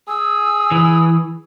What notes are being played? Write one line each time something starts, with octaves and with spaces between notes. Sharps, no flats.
G#4 E6
E3